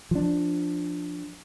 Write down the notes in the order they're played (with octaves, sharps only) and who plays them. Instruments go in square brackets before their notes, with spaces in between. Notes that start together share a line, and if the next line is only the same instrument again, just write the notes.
[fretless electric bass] F3 D4